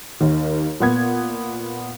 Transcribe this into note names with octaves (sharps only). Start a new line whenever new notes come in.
D#2 D#3
A#2 B3 G#6